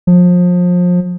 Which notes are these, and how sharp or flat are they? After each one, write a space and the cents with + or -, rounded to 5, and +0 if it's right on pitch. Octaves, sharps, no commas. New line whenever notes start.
F3 +30